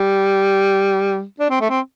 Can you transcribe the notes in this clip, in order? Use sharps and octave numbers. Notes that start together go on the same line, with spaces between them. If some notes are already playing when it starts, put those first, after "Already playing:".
Already playing: G3
D4
C4
A3
C4